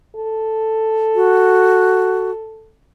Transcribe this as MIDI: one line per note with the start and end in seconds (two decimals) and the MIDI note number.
0.15 2.72 69
1.15 2.31 66